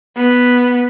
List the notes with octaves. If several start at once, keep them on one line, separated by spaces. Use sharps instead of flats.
B3